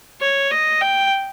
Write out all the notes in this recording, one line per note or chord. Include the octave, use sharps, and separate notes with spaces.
C#5
D#5
G5